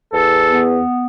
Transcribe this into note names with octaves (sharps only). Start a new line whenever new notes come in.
E2 A4
B3